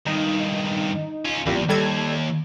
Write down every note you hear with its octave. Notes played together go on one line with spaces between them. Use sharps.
G2 D#3 D#4
C#4 F4
A1 E2 A#2 G3
D#2 G3 A4 G#6